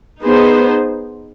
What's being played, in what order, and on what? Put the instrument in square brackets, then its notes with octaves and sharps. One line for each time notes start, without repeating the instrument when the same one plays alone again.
[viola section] B3 D#4 G#4 C5